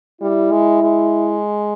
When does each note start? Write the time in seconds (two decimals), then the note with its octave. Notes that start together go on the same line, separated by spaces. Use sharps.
0.21 G3 E4
0.52 G#3
0.82 G#3